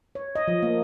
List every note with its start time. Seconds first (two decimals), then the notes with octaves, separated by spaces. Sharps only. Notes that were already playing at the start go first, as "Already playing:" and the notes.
0.15 C#5
0.35 D#5
0.48 F3
0.63 A#3